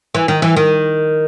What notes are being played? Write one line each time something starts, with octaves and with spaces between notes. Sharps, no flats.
E3
D#3
E3
D#3